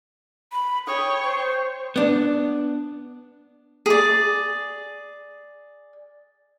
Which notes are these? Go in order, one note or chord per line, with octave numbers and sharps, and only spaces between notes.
B5
C#5 G5 D#6
C5
B3 D4
G#4 D5